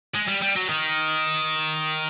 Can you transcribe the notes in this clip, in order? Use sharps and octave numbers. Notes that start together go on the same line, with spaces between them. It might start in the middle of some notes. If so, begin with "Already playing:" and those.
G#3
G3
G3
F#3
D#3